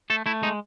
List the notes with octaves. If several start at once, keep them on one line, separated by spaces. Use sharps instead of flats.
A3 A4
A3 E4
G#3 D#4